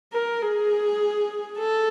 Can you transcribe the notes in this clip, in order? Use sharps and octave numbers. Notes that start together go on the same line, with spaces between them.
A#4
G#4
A4